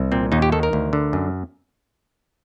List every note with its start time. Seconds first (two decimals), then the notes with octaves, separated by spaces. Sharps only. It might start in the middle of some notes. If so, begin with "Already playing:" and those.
Already playing: C2
0.12 A#2 C4
0.32 D#2 D#4
0.42 G4
0.52 D#3 A4
0.63 A#4
0.73 D2
0.93 D3
1.13 F#2